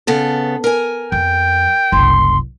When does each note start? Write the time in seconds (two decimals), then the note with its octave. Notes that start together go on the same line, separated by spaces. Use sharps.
0.07 C#3 B3 A4
0.64 A#4 G#5
1.12 F2 G5
1.92 F#1 C2 C6